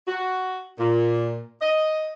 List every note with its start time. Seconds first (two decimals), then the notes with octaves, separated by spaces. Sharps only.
0.07 F#4
0.79 A#2
1.61 D#5